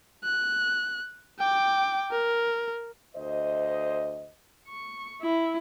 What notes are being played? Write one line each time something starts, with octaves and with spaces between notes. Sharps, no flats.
F#6
G5 D6
A#4
D2 C5 D#5
C#6
E4